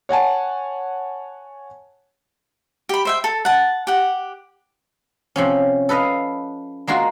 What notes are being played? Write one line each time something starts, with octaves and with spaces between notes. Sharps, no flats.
C#5 F#5 G#5 A5
G4 B5
C5 E5 G5
A4
F#5 A5
G4 F#5
C3 F3 C#4
A4 B4 D#5 F5
G#3 A#3 F4 F#4